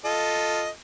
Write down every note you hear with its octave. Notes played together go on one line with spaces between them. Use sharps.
F4 A4 D#5